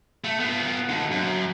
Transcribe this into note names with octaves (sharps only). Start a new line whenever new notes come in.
A3
B3 F4
D#2 D3
F#2